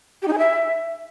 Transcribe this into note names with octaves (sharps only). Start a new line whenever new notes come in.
G4
D#4
G#4
E5